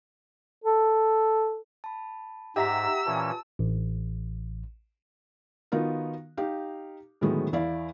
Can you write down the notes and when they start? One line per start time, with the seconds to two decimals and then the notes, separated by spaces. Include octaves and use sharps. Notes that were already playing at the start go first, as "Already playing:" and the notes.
0.64 A4
1.84 A5 B5
2.56 G#2 G4 E5 F#5 A#5 E6 A#6 B6
3.07 A#2 E3 C#4 A5
3.59 A1
5.72 D#3 B3 D#4 F4 F#4 A#4
6.37 D#4 G4 F5
7.21 A2 D3 D#3 F#3 G#3 B3
7.53 E2 E4 D5 F5